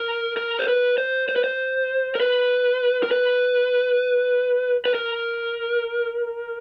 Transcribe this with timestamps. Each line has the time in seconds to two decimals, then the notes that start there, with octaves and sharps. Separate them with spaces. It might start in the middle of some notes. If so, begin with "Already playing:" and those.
Already playing: A#4
0.37 A#4
0.59 C5
0.68 B4
0.98 C5
1.29 C5
1.36 B4
1.44 C5
2.15 A#4
2.20 B4
3.03 A#4
3.11 B4
4.85 B4
4.95 A#4